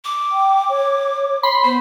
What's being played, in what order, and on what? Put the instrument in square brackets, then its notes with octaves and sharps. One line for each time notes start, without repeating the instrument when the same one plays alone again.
[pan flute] D6
[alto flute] G5
C#5
[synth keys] B5 C6
[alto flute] B3 [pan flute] C5